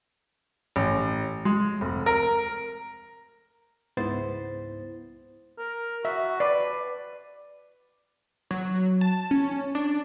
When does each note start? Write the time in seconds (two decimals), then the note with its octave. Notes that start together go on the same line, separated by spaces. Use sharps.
0.76 A1
1.45 G#3
1.81 F1
2.06 A#4
3.97 C#2 G#2 B3 E4 C5 A6
5.58 A#4
6.05 F#4 E5
6.40 B4 D5
8.51 F#3
9.01 A5
9.31 C#4
9.75 D4